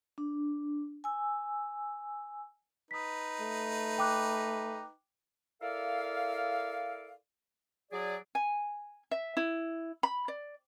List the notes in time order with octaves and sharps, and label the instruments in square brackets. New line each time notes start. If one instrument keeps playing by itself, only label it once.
[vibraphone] D4
G#5 E6
[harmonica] D#4 B4 [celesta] D#6 B6
[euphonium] A3
[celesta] G5 D6 F#6
[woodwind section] E4 A4 A#4 D5 F5
F#3 G#4 D5
[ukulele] G#5
E5
E4
B5
D5